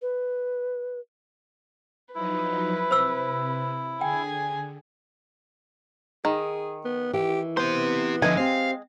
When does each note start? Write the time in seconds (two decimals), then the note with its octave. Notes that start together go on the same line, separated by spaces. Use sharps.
0.02 B4
2.15 F3 F#3 D#4 E4 B4
2.91 C3 C5 E6
4.01 D3 G#4 G5 G#5
6.25 D#3 G#4
6.85 B3
7.13 E3 G4
7.57 B3 G4 C5 C6
8.22 D3 F3 G#3 B4 D#5 E5 G#5
8.37 C4 G4 F5